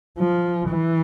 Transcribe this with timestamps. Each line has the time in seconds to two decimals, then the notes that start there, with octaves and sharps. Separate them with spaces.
0.19 F3
0.69 E3